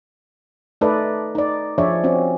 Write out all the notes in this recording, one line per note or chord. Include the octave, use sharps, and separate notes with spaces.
A3 D#4 A4 B4 D5 D#5
D#4 D5
F3 D4 G#4 C#5 D5 E5
C4 C#4 F#4